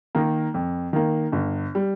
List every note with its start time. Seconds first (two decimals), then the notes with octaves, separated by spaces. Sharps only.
0.15 D#3 A#3
0.54 F2
0.93 D#3 A#3
1.32 G1
1.75 G3